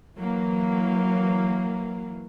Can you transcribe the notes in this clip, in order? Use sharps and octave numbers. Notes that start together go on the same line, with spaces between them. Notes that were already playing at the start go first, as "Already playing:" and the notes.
E3 F#3 A#3